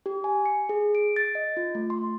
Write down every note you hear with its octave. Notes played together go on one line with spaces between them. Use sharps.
G4
G#5
C#7
G#4
D7
A6
D#5
F4
A3
C6